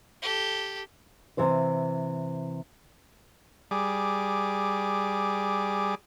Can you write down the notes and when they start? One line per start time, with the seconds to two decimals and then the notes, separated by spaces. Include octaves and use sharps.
0.22 G4 A4
1.37 C3 E3 C5 F5
3.71 G3 G#4 D6